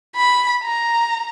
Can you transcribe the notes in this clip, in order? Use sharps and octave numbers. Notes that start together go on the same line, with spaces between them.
B5
A#5